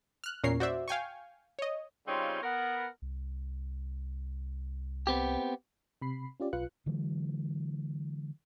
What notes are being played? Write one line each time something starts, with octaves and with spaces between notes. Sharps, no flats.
F6 F#6
E2 A#2 C#4 A#4 C#5 C7
F#4 C5 D5 E5
F5 G5 G#5 C#6
C#5 D#5
C#3 G3 C4 D#4 F4 C#5
B3 A#4 F#5
C2
B3 C4 G4
C3 B5 C7
C#4 F4 G4 D5
B1 F4 B4 F5 F#6 C#7
D3 E3 F#3 G#3